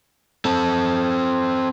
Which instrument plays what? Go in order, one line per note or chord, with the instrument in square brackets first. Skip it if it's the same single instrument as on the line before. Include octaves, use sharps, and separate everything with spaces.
[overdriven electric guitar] C4 A4